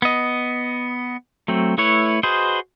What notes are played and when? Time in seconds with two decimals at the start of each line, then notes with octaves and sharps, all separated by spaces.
0.02 B3 D#5
1.48 F#3 A3 C4
1.78 A3 E4 B4 C#5
2.23 F#4 G#4 B4 C5 D#5